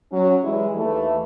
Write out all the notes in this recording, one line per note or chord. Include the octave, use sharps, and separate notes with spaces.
F#3 C#4
E3 G3 G#3 E4
D#2 E3 A3